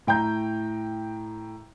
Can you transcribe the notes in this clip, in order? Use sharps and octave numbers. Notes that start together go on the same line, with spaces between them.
A2 G5 A#5 G6